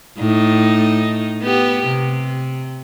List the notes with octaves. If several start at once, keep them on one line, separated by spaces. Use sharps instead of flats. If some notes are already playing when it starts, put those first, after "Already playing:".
A2 D#4
B3 G4
C3